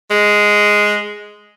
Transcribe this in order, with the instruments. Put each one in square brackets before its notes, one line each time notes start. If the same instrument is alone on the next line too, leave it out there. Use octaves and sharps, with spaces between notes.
[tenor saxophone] G#3